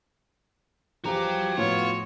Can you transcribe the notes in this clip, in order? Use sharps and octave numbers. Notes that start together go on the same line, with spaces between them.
E2 F3 E4 F#4 G4 A#5
F2 A2 B3 F4 C#5